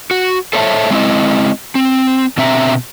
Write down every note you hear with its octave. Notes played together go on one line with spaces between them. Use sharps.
F#4
A4 C5 C#5 E5 A5
G#3 C4 E4 D#5
C4
B2 D3 C4 E5 A5 A#5